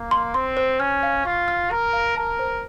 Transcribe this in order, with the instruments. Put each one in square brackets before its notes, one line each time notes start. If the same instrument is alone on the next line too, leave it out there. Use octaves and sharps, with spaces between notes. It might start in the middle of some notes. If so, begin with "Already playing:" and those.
Already playing: [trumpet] A#3
[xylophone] C6
[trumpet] C4 [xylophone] C6
[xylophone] C5
[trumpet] C#4 [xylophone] F6
[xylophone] F5
[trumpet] F4 [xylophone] C#6
[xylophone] F6
[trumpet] A#4 [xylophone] F6
[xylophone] F5
[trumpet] A#4 [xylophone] A5
[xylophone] C5